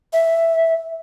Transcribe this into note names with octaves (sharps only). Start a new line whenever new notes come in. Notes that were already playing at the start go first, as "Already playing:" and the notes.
E5